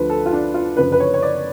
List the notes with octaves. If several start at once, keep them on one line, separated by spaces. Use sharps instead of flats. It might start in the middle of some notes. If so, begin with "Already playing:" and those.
Already playing: D2 D3 F3 B4
A4
F4
D4
F4
F#1 F#2 D3 F3 B4
B4
C#5
C#5
D5